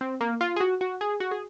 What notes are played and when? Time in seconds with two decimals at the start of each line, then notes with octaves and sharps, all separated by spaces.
0.01 C4
0.21 A#3
0.41 F4
0.56 G#4
0.60 F#4
0.81 F#4
1.01 G#4
1.20 F#4
1.31 G#4